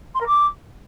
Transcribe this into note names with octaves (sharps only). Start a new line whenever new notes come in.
C6
A#4
D6